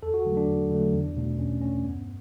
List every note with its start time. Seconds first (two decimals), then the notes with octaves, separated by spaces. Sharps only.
0.03 E2 A4
0.14 F#4
0.25 D3 F#3 A3
0.37 D4
0.48 E2
0.71 D3 F#3 A3
0.94 E2
1.17 B2 A3
1.39 E2 C#4
1.61 B2 A3 C#4
1.84 G2 B3